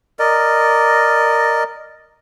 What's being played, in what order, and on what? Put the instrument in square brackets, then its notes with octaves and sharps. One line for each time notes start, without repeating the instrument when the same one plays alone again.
[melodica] A#4 D5 D#5